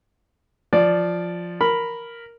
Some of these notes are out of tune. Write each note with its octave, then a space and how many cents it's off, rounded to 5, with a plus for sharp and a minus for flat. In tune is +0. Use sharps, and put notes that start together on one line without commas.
F3 +0 D5 +0
A#4 +0 B5 +0